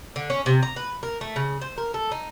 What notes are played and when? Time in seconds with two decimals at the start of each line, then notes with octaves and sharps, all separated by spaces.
0.16 D3
0.30 C#4
0.46 C3
0.63 A#5
0.76 B4
1.03 A#4
1.21 A3
1.36 C#3
1.61 C5
1.78 A#4
1.94 A4
2.12 D#4